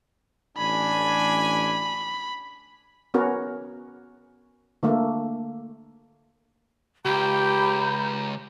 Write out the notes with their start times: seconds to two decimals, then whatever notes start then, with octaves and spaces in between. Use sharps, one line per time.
0.58 A1 D4 G#5 B5
3.14 B3 C#4 F#4 A#4
4.83 D3 A3 A#3
7.05 C#2 G4 A#5 B5 G6